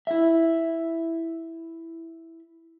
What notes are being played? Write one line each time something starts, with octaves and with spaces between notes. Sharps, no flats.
E4 E5